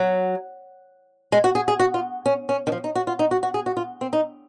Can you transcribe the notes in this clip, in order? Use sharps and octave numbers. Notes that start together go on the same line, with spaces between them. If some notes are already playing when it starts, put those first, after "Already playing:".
Already playing: F#3
G#3
F#4
G#4
G#4
F#4
F4
C#4
C#4
D#3
F3
D#4
F#4
F4
D#4
F#4
F#4
G#4
F#4
F4
C4
D#4